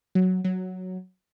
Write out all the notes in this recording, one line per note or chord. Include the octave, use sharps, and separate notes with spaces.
F#3
F#3